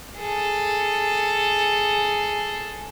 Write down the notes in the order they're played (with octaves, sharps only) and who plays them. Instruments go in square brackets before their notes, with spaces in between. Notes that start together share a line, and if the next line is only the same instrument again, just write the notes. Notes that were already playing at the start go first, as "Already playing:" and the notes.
[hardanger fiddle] G#4 A4